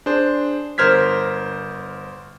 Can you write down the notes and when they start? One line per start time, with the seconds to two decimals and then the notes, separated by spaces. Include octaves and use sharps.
0.06 D4 G#4 C5
0.78 G1 A#4 C5 F6 G#6 B6